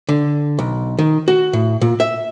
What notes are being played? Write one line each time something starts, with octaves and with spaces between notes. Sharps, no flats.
D3
B1
D#3
F#4
A2
A#2
E5